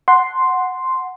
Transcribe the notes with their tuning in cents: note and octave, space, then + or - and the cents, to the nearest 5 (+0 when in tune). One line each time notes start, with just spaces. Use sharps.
F#5 -5 A5 +0 C6 +0